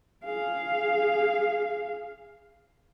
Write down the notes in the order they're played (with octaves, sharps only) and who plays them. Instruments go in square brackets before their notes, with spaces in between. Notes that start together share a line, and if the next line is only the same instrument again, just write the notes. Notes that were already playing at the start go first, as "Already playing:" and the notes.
[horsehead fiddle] G#4 F5